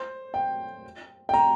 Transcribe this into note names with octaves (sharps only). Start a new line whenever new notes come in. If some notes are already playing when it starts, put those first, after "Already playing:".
Already playing: C5
G5
G5
A#5